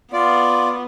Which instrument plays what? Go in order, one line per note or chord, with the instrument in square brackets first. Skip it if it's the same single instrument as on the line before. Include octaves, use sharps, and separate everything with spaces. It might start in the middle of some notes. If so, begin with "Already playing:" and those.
[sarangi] B3 [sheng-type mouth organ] F4 D5